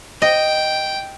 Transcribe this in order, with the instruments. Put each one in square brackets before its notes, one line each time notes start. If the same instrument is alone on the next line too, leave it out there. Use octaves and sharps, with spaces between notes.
[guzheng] D#5 [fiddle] G5